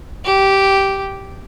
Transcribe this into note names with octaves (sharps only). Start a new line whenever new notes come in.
G4